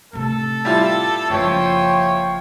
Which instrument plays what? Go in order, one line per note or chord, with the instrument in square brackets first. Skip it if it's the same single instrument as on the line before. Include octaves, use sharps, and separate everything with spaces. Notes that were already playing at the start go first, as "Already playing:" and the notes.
[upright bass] A2 C3 [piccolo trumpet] A4
[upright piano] G3 E4 F4 [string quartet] A5
[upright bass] F#1 [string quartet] F3 G5 [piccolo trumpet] C#5